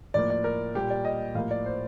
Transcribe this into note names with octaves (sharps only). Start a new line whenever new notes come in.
A2 F3 A#3 D5
D5
A#4
A#2 G3 A#3 G4
D5
D#5
A2 F3 A#3 F5
D5
C5